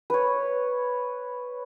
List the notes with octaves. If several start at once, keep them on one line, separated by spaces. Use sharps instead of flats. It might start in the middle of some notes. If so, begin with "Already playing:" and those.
B4 C#5